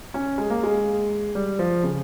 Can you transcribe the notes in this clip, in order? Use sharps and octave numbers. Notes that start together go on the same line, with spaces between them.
C#4
G#3
A#3
G#3
G3
F3
C#3